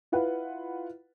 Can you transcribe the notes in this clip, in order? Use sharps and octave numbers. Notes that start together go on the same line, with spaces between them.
E4 F4 B4 F#5